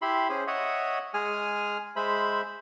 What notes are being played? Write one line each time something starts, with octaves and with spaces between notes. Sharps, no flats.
E4 G4 E5 B5 C6
C#4 G#4 C5
C#5 D#5 E5 F#5
G#3 G#4 G#5 D#6 F6
G#3 C5 E5 B5